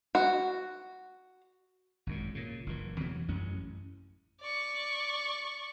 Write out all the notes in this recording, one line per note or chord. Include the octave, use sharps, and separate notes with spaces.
F#4
G#1 F#2 A#2
A#2 C#3
F#1 A#2 E3
E2 C3 E3 F#3
A1 F#2 C#4
D5 C#6